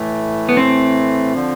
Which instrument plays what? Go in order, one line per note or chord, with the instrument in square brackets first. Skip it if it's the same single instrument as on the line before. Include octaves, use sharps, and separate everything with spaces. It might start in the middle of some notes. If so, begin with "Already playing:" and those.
Already playing: [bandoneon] A2 E3 A3
[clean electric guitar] B3
C4
[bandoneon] D3 F3